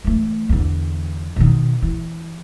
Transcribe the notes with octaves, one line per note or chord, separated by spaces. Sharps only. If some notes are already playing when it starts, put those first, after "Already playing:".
E3 A3
E2 D3
B2 D#3
E3